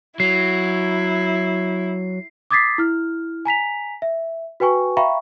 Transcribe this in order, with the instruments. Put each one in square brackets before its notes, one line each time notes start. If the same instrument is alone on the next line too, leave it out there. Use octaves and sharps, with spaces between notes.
[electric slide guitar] F#3 [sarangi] E4 [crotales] C7
[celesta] D6 D#6 G#6 A6 B6 C7
E4 F6
G#5 A#5 B6 F7
E5
F#4 B4 G5 G#5 C#6
E5 F5 G5 A#5 B5 C#6